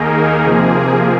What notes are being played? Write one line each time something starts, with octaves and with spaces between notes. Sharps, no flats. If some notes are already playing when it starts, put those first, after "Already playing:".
Already playing: D#2 D#3 A#3 D#4 G#4 A#4
C3 F3 A#3